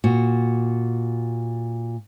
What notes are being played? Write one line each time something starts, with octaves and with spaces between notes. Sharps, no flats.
A#2 F#4